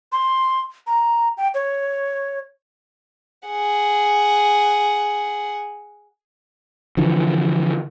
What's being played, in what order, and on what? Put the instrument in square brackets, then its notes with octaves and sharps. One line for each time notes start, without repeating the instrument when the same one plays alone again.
[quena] C6
A#5
G5
C#5
[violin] G#4 F#5
[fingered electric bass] D3 E3 F3